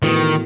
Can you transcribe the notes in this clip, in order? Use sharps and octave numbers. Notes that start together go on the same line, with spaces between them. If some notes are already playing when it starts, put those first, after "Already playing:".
A2 D#3 E3 B3 F#4 B4